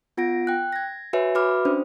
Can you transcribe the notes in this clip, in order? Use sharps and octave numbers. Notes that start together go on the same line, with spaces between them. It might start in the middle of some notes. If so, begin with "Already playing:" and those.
B3 F4 F#5 A#6 D7
G5 F#6
G#6 A#6
F#4 B4 C#5 E5 G#5
F#4 B4 E5 B5 D6 F6
C#4 D4 C5